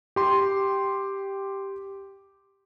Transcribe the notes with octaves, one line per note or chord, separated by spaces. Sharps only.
G4 C6